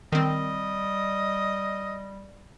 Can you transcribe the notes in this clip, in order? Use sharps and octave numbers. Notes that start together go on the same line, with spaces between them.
D#3 G3 C4 D#5